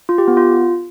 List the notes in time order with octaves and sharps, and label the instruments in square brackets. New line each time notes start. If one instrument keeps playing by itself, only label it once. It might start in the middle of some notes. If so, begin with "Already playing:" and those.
[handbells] F4
G4
B3
F4